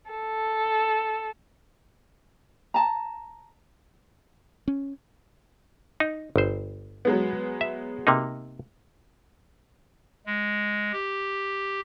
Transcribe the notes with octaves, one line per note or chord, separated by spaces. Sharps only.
A4
A5 A#5
C#4
D#4
G1 C5
F#3 G#3 B3
E5
C3 A#3 D#4
G#3
G4